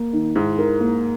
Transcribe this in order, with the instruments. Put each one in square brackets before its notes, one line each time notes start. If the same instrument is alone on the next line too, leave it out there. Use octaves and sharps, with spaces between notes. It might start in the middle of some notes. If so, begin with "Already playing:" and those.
Already playing: [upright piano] A#3
D#3
[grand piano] G#2 [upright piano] E4
[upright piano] A#4
A#3